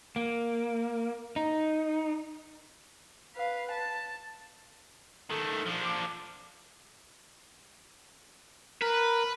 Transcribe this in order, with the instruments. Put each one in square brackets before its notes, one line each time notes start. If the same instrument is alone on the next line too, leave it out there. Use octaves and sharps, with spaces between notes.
[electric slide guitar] A#3
D#4
[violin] B4 F5
A5
[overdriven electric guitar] D#3 A3 [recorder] A4
[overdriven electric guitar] F3 D4
[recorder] D6
[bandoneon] A#4 [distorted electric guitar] B4